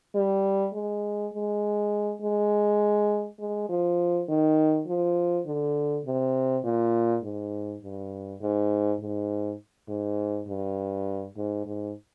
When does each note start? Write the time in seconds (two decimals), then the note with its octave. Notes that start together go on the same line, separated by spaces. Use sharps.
0.15 G3
0.74 G#3
1.34 G#3
2.22 G#3
3.40 G#3
3.69 F3
4.29 D#3
4.87 F3
5.46 D3
6.05 C3
6.64 A#2
7.23 G#2
7.83 G2
8.41 G#2
9.00 G#2
9.88 G#2
10.48 G2
11.37 G#2
11.66 G#2